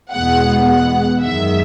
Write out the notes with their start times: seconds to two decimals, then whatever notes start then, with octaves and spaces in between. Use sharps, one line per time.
0.12 E2 B2 G#3 B3 F#5
0.66 F#5
1.19 F#2 D#3 G#3 E5